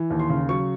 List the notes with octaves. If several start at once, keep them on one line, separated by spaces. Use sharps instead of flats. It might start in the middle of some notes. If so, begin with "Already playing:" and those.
Already playing: E3
D#2
C6
C#3
F#3 C#6